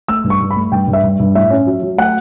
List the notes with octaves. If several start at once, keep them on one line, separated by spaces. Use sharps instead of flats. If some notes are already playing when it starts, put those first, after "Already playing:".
A3 E6
G2
C#6
G2
B5
A3
G2 G5
G2
E5
G2
G2
A2 E5
C#4
F#3
F#3
A3 F#5